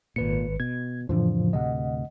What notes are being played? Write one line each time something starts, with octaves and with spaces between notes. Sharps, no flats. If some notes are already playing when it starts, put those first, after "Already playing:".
G#1 A#2 B4 C#7
B2 G#6
F2 A2 C#3 E3 F3 D4
D2 A2 C3 D#5 F#5